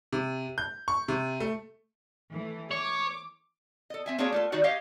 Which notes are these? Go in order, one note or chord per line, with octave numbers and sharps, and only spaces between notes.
C3
G6
C#6
C3
A3
E3 A3
C#5 D6
A4 D#5
C4 E5 G#5
A#3 C4 D4 F#4 G#4 C#5
A3 F4 A4
D#3 G3 D#4 F#4 D5
G4 C#5 D#5 F5